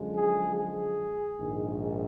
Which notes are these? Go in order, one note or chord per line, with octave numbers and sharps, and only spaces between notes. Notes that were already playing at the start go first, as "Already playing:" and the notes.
Already playing: F#2 D3 F3 G#3
G#4
G#4
A#1 G#2 D#3 G#3